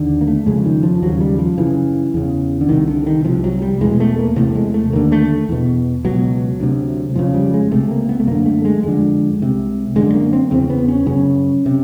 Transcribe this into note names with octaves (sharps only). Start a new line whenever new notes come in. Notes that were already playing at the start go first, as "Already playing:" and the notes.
Already playing: D#2 D3
A#3
A3
F2 C#3 G#3
D#3
F3
D#2 C#3 F#3
G3
F3
F#2 C#3 E3
E2 C#3
D3
C2 C3 D#3
D3
D#3
C2 C3 F3
F#3
G3
E2 B2 G#3
A3
A#3
E2 C3 A3
G#3
A3
D#2 D3 A#3
A3
E2 B2
C#2 B2 F#3
D2 C3
F2 C#3 F3
G3
G#3
C#2 C3 A3
A#3
B3
A3
F#2 D3 A#3
A3
G#3
F2 D3 G#3
C2 C3
F#2 D3 G#3
A#3
C4
E2 C#3 C4
B3
C#4
F#2 C#3 C#4
C3